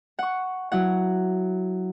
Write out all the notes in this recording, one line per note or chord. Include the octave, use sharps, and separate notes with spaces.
F#5 C#6
F#3 E4 F#5